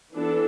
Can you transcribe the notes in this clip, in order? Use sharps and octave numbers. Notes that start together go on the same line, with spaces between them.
E3 B3 D4 A4